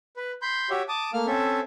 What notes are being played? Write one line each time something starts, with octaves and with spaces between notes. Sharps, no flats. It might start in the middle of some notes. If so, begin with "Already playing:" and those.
B4
B5 C6 G6
F#4 G4 C#5 E5
A5 D6 D#6
A3 A#3 F5 F6
C4 C#4 A4 E5